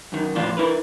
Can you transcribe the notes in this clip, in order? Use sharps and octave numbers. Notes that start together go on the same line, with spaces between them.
F#2 D#3
F2 A2 D4 F4
E4 A#4 B4